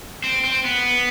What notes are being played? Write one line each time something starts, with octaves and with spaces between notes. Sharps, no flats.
C4
C4
B3